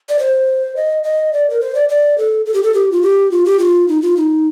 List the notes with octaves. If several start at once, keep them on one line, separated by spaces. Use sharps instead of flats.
D5
C5
D#5
D#5
D5
A#4
C5
D5
D5
A4
A4
G4
A4
G4
F4
G4
F4
G4
F4
D#4
F4
D#4